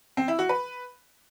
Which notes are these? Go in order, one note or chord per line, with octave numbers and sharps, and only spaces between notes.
C4
E4
F#4
B4